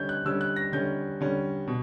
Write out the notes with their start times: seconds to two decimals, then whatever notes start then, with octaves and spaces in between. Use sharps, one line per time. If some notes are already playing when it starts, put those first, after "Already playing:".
Already playing: D3 G3 C#4 G6
0.09 F#6
0.25 D3 G3 C#4 E6
0.41 F#6
0.56 A#6
0.72 D3 G3 C#4 G6
1.21 D3 G3 C#4
1.67 B2